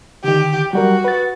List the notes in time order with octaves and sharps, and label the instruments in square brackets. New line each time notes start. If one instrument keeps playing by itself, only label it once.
[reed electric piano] D3 D#3 [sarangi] G4
[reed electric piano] F#3 G3 A#4 [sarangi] F#4
[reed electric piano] B4 A6